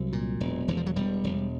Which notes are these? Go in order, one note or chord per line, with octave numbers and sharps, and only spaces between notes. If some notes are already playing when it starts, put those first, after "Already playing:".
Already playing: C2 F#3
A#2
E1
E1 E3
F3
F#3
E1 G3
E1